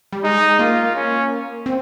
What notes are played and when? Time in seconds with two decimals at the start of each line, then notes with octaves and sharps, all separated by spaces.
0.12 G3
0.24 G#3 D#4
0.59 A#3 F4
0.96 C#4
1.66 C4